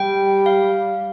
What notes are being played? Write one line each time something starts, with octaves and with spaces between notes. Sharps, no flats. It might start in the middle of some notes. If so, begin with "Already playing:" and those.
Already playing: G3 G5
F5